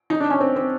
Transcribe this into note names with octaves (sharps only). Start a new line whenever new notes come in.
D#4
D4
C#4
C4
C4